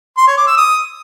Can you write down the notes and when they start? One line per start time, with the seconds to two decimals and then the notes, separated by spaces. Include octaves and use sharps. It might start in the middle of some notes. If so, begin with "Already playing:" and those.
0.17 C6
0.27 C#5
0.37 D6
0.47 E6
0.57 D#6